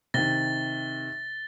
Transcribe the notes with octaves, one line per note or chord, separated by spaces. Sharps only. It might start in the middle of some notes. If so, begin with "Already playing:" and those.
C3 D#3 A6 A#6 G7